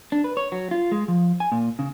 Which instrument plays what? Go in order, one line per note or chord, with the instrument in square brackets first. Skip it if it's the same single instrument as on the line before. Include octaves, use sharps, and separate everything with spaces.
[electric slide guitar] D4
B4
C#5
F#3
F4
G#3
F3
G#5
A#2
C#3